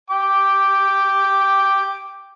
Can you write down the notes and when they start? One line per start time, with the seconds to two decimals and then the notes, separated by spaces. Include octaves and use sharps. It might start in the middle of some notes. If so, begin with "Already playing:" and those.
0.10 G5 D6